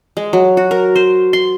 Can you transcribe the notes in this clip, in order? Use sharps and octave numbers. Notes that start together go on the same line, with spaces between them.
G#3
F#3
F#4
A#4
C5
C6